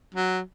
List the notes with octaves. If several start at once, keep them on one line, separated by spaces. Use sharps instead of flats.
F#3